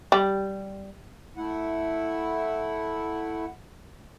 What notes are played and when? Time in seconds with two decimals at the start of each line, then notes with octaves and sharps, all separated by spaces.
0.12 G3
1.37 A3 E4 F#5